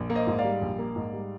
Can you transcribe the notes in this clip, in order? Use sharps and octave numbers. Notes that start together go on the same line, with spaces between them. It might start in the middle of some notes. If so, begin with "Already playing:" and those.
Already playing: A#1
A#3
C5 D#5
G#2
D5 F5
G3
A#1
A#3
G#2
G3